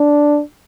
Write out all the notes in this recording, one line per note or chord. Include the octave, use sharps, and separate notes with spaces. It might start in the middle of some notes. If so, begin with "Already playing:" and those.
Already playing: D4